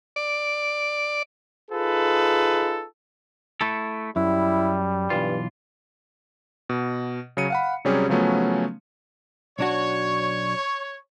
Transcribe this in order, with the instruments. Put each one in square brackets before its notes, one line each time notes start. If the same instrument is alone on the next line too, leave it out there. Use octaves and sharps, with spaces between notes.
[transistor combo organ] D5
[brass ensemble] D#4 F4 G#4 A4 B4
[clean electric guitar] A3 E4 A4
[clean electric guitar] F#2 [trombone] G3 [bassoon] E4
[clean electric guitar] B1 E3 F4 [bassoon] G2
[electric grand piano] B2
C#3 F#3 C#7 D#7
F5 F#5 B5
C3 F#3 G3 C#4 G4 G#4
C#3 F3 F#3 A3 B3 C#4
[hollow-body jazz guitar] B1 D4 F#4 [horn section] C#5